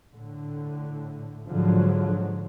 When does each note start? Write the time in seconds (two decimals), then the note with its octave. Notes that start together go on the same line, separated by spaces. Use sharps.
0.12 A2 D3
1.48 G#2 D3 F3 F#3